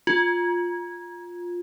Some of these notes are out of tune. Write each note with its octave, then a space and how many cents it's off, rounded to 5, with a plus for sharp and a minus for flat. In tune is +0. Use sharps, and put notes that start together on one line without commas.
F4 +10